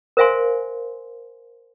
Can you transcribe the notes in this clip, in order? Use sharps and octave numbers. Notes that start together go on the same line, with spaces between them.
A#4 C5 E5 F5 G#5 C6